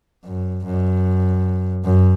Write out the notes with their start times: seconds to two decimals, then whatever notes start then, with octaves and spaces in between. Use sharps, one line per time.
0.25 F#2
0.65 F#2
1.85 F#2